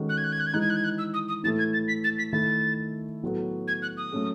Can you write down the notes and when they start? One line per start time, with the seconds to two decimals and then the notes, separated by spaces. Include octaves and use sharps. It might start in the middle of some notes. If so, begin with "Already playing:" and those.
Already playing: D#3 G#3 C#4 F#4 A4
0.09 F#6
0.17 G#6
0.24 F#6
0.32 G#6
0.40 F#6
0.47 G#6
0.54 E3 G#3 D#4 F#6
0.61 G#6
0.70 F#6
0.76 G#6
0.84 F#6
0.98 E6
1.14 D#6
1.28 D#6
1.44 A2 E3 A3 A6
1.59 G#6
1.73 A6
1.88 B6
2.04 A6
2.18 B6
2.33 D#3 A3 E4 A6
3.23 A2 F#3 B3 F#4 A4
3.68 G#6
3.82 F#6
3.97 D#6
4.12 F#3 A3 C#4 G#4